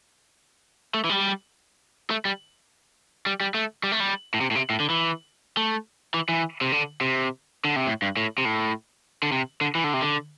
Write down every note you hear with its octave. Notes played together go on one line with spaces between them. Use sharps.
A3
E3
G3
A3
G3
G3
G3
A3
G3
A3
G3
A2
C3
A2
C3
A2
D3
E3
A3
E3
E3
C3
D3
C3
D3
C3
A2
G2
A2
C3
A2
D3
C3
D3
E3
D3
C3
D3